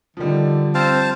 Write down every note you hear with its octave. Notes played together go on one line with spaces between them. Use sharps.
D3 D#3 F3 G3
C4 C5 F5 A5